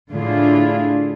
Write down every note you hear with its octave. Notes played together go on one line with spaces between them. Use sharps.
A2 D3 D4 E4 F4 G#4